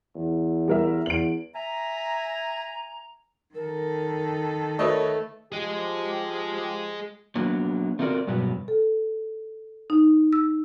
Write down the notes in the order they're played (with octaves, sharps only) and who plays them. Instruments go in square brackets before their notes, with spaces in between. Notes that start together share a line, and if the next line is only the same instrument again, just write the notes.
[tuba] E2
[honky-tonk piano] G3 A#4 E5
[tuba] E2 [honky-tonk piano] D7 F#7
[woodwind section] E5 G#5 A#5
[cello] D#3 A4 [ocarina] A#4
[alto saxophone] A3 [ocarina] A#4 [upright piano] B4 C#5 D#5
[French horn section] F3 G4 [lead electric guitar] G#4 D#5
[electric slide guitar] F#3 A#3 B3 D4
A3 C4 F4 F#4 A#4 D5
G2 B2 F#3 B3
[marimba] A4
D#4
E6